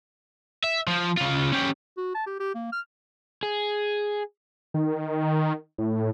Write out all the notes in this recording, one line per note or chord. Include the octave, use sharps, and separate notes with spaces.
E5
F3
C#3 F4
C#4 G4
F#4
A5
G4
G4
A#3
F6
G#4
D#3
A2